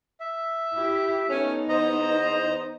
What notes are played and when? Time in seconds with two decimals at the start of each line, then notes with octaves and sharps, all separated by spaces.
0.20 E5
0.73 E4 G4
1.30 A3 B3 C#4 D#4
1.69 E2 C5 D#5 A#5